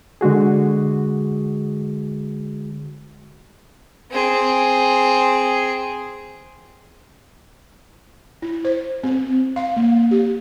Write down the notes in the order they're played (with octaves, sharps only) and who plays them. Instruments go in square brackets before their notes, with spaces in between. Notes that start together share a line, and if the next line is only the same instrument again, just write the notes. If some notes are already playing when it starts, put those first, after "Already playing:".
[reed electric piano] D3 G#3 F#4 G#4
[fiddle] C4 G#4
[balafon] E4
C5
C4
F5
A#3
G4